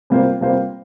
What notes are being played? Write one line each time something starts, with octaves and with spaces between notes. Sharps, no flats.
C3 G3 A#3 F4 C5
C3 G3 A#3 F4 C5